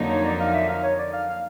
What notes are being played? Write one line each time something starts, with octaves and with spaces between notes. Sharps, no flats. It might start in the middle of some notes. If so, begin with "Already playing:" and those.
Already playing: F2 D3 F#3 A#3 D#4
C#5
D5
F5
E5
F5
C#5
D5
F5
F5